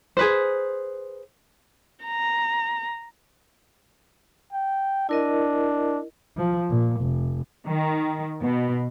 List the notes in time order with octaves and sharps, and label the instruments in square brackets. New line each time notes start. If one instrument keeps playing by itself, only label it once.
[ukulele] G#4 B4 C5
[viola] A#5
[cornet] G5
[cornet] D4 [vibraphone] E4 A#4 D#5
[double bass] F3
A#2
F1
[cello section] D#3
B2